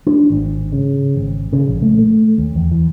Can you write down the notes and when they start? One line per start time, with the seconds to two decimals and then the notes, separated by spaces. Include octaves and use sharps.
0.06 D4
0.30 G#1
0.72 C#3
1.15 G#1
1.53 C#3
1.68 A#1
1.82 A3
1.99 A3
2.38 D#2
2.55 E2
2.71 E3